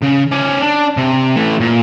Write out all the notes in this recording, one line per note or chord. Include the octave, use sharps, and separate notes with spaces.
C#3
C#4 D5
D4
C3
E3 A3
A#2